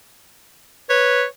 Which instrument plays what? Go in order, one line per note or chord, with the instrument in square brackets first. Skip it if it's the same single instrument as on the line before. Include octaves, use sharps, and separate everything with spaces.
[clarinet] B4 [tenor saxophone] C#5